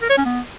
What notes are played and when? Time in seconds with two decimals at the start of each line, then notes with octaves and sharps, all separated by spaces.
0.02 A#4
0.10 C#5
0.17 C#4
0.25 B3